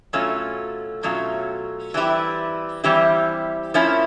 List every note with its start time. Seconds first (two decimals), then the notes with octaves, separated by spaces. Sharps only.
0.13 B2 F#3 A3 C#4 F4
1.03 B2 F#3 A3 C#4 F4
1.94 E3 G3 C4 E4 G4
2.84 E3 G3 C4 E4 G4
3.74 F3 A#3 C#4 E4